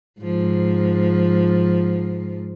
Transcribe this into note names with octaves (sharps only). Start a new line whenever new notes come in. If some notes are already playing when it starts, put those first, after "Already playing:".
G#2 F3